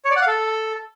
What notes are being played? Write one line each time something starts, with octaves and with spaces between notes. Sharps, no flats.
C#5
D5
F#5
F5
A4